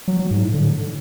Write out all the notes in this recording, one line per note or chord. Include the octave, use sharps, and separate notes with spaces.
F#3
F#3
G#2
A2
D3